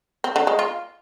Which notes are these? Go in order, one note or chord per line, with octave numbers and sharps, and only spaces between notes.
C4
D3
G#3
F4